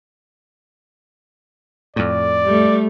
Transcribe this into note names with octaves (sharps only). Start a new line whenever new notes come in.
F2 A2 D5
G3 A3